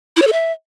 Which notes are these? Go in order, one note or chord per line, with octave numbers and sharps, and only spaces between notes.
E4
C#5
A4
E5